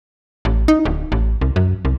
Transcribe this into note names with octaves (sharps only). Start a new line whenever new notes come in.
A1
D#4
D1
A1
C2
F#2
C2